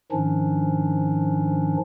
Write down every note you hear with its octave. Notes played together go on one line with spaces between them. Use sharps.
G#2 D#3 F3 C#4 D4